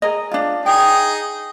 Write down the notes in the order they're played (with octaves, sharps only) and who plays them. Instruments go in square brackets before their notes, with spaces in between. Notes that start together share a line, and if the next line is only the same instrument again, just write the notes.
[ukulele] G#4 A#4 D#5
D4 F4
[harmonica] D#4 G#4 [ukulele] G5